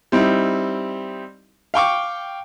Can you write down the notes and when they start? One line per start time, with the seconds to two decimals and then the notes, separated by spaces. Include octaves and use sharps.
0.12 G3 C4 D#4 E4
1.74 F5 G5 C#6 D6